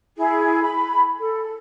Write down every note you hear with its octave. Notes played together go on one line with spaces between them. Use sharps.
E4 G#4
B5
A4